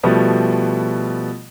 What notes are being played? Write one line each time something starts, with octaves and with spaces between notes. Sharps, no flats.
B2 F3 G3 A3 B3